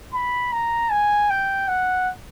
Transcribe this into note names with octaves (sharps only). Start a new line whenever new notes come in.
B5
A#5
G#5
G5
F#5